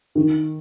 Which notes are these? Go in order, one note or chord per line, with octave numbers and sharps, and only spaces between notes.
D#3